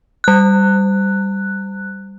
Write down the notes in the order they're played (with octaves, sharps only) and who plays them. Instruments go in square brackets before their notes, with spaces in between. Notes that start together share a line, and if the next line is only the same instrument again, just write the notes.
[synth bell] G3 F#6